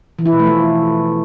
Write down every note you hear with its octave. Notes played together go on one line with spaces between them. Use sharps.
E3
E4
B2
A3
F3